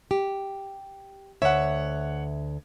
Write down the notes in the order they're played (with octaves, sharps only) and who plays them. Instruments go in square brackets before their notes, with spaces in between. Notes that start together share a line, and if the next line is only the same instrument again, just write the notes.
[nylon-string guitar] G4
[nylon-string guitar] D2 E5 [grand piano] C#5 F#5